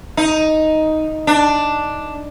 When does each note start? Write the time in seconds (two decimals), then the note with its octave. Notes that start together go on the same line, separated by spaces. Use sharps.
0.17 D#4
1.27 D4